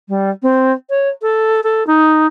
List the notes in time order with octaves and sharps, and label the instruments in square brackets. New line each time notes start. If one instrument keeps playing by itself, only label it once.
[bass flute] G3
C4
C#5
A4
A4
D#4